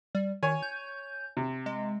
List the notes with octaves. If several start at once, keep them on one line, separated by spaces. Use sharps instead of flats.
G3
D#3 C#5 G#5
G6
C3
G#3